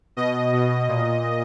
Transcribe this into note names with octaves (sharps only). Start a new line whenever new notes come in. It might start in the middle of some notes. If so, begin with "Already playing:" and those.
B2 D#5
B2
A#2